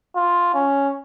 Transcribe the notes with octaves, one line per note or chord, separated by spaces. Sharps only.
F4
C#4